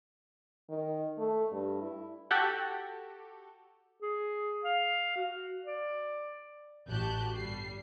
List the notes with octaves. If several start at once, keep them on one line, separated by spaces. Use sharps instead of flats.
D#3
A3
G2
E4
F#4 G4 A4
G#4
F5
F#4
D5
A1 F#4 G4 A5 F#6 G6
G1 G3 C7